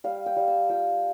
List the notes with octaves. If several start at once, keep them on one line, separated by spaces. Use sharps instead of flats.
G3 F5
G5
G3
A5
F4 G5